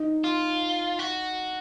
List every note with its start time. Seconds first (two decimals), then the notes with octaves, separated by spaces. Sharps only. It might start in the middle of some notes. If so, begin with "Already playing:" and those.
Already playing: D#4
0.24 F4
0.99 F#4